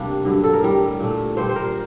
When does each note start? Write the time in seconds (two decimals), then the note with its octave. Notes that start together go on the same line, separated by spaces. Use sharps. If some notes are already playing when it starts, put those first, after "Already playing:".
Already playing: C3 G3 A3 A#3 D4
0.25 G2 D3 F#3
0.44 A4
0.53 A#4
0.62 A2 G3
1.00 A#2 A3
1.37 A#2 G3 C5
1.49 C5
1.56 A#4